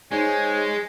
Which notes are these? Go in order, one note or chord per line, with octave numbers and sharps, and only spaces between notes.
G#3 D#4 C5 C#5 G#5